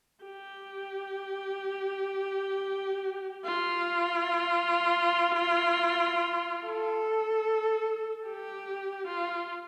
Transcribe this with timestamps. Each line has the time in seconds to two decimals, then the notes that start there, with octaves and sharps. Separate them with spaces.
0.24 G4
3.45 F4
6.66 A4
8.27 G4
9.07 F4